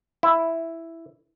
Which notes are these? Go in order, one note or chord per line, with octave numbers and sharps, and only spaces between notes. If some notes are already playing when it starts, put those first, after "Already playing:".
E4